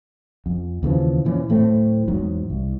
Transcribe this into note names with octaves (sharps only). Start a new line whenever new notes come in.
F2
D#2 C#3 E3 F3
A#2 E3 F3 C#4
D1 A2 A3 C4
E2 G#2 F#3
C2